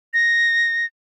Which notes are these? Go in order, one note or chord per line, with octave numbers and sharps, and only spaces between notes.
A#6